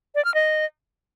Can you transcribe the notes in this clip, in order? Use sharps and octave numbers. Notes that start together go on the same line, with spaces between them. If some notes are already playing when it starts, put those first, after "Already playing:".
D5
F6
D#5